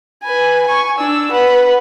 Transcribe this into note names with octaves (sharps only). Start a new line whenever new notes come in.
B4 G#5
G#5 C#6
D4 E6
B4 F#5